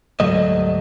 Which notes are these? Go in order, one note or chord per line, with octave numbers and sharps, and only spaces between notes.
D2 G#2 F#3 G3 A3 D#5